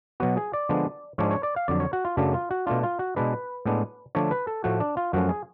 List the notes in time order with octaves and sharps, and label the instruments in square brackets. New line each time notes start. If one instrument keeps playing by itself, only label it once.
[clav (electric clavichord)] B2 F#3 B3 F#4
G#4
D5
D3 F3 G#3 B3 D4
G#2 F3 G#3 D4 C#5
C#5
D5
F5
F2 D3 F#3 D5
C#5
F#4
F4
F#2 C#3 F#3 A3 D4
F4
F#4
B2 A3 D4 F4
F4
F#4
B2 G#3 D4 B4
A2 G#3 B3 D4
D3 F3 A3 D4 C#5
B4
A4
A2 F3 A3 F#4
D4
F4
F#2 F3 A3 C#4 F#4
G#4